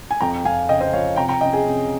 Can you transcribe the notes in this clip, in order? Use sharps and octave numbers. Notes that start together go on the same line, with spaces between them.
G#5
F2 G5 A#5
F2 F5 G#5
C#3 D#5 G5
C5 D#5
F3 C#5 F5
C3 G5 A#5
G5 A#5
C#4 D#5 G5
G#4
C3